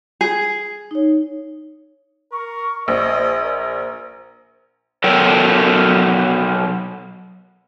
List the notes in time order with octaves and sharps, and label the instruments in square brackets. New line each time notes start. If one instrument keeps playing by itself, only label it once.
[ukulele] G#4
[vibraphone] D#4 C#5
[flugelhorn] A#4 [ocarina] C#6
[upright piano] A#1 [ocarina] C5 [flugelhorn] D#5
[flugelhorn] A#4 [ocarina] C5
[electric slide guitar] B2 F#3 A4 A#4 G5